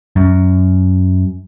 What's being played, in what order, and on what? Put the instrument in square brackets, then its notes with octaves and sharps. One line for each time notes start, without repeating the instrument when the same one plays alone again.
[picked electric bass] F#2